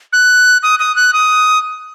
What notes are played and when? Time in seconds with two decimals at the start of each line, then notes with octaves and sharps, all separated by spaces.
0.13 F#6
0.63 D#6
0.79 D#6
0.96 F#6
1.13 D#6